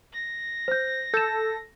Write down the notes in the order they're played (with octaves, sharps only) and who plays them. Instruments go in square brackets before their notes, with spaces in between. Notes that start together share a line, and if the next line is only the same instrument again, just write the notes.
[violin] A#6
[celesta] C5 G6
[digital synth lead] A4 [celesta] G6 E7